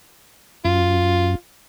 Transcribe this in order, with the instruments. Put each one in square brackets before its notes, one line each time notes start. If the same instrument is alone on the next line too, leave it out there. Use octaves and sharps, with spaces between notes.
[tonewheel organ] F#2 [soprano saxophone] F4